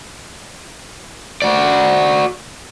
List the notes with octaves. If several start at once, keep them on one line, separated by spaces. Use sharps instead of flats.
F#4 D5